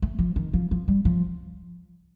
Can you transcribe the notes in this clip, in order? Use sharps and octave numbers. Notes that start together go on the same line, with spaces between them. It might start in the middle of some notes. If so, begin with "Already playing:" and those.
A3
F3
D#3
F3
F3
G3
F3